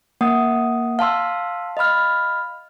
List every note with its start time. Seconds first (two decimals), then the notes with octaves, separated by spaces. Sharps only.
0.21 A#3 F#5 D#6
0.99 F5 A5 C6 E6
1.77 D#5 F5 B5 F6